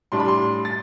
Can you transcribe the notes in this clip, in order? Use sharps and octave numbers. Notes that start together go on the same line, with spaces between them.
A2 G3 D4 C6
B5
C6
A6